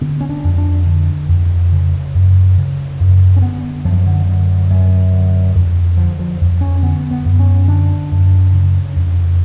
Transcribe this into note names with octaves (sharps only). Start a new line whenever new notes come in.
D3 B3
C#4
D4
F2
D4
D3
F2
C#3
F#2
C#3
F#2
C#4
D3 B3
F#2 F3
D3
D3
F#2
D3
F2
D3 F3
F3
F2
C#4
D3 B3
B3
F#2
C#4
D3 D4
F#2
C#3
F2